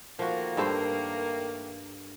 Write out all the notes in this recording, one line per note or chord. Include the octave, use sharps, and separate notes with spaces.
D#3 F3 A3 A#3 F#4
G2 A4 C5